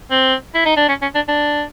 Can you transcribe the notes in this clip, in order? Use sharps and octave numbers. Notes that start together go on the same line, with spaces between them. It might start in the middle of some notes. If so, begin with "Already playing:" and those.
C4
E4
D#4
D4
C#4
C#4
D4
D4